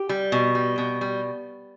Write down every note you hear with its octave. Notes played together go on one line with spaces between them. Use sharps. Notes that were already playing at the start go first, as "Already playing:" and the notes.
Already playing: G4
G3
B2
G3
B2
G3